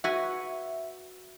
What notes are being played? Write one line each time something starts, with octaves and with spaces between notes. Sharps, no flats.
F#4 B4 E5 G#5